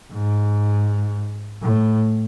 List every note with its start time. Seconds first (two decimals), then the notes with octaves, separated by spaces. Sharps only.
0.13 G#2
1.62 A2